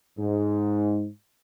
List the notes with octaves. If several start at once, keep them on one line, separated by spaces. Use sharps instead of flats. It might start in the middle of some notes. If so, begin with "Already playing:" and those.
G#2